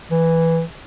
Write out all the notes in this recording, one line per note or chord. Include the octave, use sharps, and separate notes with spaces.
E3